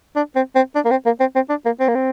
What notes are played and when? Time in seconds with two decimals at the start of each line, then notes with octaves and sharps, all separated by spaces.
0.16 D4
0.36 C4
0.55 C4
0.75 D4
0.85 A#3
0.91 C4
1.06 A#3
1.20 C4
1.35 C4
1.50 D4
1.66 A#3
1.80 C4
1.88 A#3
1.95 C4